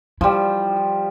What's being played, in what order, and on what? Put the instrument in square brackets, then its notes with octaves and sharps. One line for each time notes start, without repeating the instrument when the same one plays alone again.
[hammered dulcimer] F3 G3 [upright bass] E4